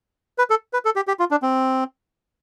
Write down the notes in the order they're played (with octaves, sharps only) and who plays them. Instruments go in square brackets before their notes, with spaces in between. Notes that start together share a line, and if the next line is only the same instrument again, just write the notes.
[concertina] B4
A4
B4
A4
G4
G4
F4
D4
C4